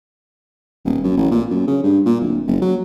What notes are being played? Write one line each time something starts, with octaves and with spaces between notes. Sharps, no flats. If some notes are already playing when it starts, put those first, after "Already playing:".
D#1
F#2
A1
A#2
F#2
C#3
G2
A#2
D1
F#1
F#3